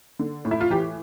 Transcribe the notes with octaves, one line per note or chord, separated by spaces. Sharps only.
D3
A2
E4
F4
E3 G4